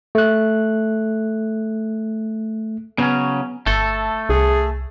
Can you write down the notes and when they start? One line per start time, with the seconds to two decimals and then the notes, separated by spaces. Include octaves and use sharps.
0.15 A3 F#6
2.98 C#3 F#3 B3 C#4
3.66 G1 A3 A4
4.29 C2 G#4